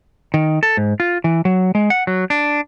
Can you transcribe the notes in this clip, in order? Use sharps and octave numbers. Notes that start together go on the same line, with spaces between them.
D#3
A4
G#2
F4
E3
F#3
G#3
F#5
F#3
D4